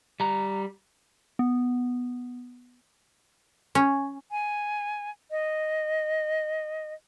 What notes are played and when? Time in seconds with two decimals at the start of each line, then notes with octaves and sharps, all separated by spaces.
0.20 G3 A#5
1.39 B3
3.75 C#4
4.31 G#5
5.31 D#5